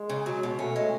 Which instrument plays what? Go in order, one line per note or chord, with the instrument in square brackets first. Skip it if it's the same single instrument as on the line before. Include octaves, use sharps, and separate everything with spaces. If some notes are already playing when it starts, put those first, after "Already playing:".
Already playing: [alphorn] G#3
[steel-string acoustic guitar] C#3
F#3
B2
[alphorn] A3 [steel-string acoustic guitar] C#4
[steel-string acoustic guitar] G#3